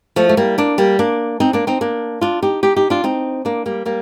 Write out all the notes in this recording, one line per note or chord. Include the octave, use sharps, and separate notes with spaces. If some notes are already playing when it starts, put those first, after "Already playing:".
F3 A3
A3
G3 A#3
A#3 D4
G3 A#3
A#3 D4
C4 D#4
A#3 D4
C4 D#4
A#3 D4
D4 F4
D#4 G4
D#4 G4
D#4 G4
D4 F4
C4 D#4
A#3 D4
G3 A#3
G3 A#3